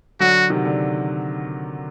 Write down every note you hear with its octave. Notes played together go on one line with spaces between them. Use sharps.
D3 F#3 F#4
C3 D#3
D3